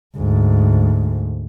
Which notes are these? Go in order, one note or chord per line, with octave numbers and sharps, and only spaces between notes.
D2 G#2